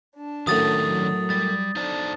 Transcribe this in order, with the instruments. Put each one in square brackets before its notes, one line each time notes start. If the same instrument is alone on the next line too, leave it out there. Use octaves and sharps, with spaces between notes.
[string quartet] D4 A5
[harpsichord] F#2 A2 [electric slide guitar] D#3 C#4 [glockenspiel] D#6 A6
[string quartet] F#3
[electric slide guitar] G3 [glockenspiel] A6
[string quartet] D4 A4 A5 [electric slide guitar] D#4 C5 D5